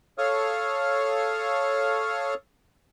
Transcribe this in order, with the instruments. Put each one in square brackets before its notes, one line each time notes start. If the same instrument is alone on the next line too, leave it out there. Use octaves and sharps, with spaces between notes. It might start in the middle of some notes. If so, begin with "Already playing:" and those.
[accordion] A4 C#5 F5 C#6 D#6 F6